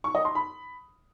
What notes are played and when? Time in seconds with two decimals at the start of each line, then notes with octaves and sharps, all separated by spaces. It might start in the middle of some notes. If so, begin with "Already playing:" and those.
0.04 C#6
0.15 D#5
0.25 C6
0.35 B5